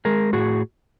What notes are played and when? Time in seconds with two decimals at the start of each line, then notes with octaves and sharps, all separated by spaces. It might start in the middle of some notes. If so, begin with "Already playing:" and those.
0.05 G#3 G#4 A#4
0.33 A2 F#4 G#4